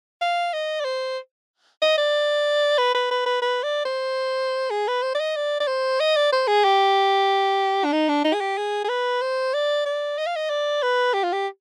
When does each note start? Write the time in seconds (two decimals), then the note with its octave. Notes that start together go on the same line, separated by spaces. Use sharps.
0.21 F5
0.53 D#5
0.80 D5
0.85 C5
1.82 D#5
1.98 D5
2.78 B4
2.95 B4
3.11 B4
3.26 B4
3.42 B4
3.63 D5
3.85 C5
4.70 G#4
4.88 B4
5.03 C5
5.15 D5
5.20 D#5
5.36 D5
5.60 D5
5.67 C5
6.00 D#5
6.16 D5
6.32 C5
6.47 G#4
6.65 G4
7.84 D4
7.92 D#4
8.09 D4
8.25 D#4
8.33 G#4
8.41 G4
8.57 G#4
8.84 G#4
8.89 B4
9.22 C5
9.54 D5
9.86 D5
10.18 D#5
10.27 F5
10.36 D#5
10.49 D5
10.83 B4
11.14 G4
11.24 F4
11.33 G4